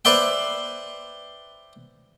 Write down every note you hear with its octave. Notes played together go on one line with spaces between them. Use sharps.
B4 C5 D5 E5 G5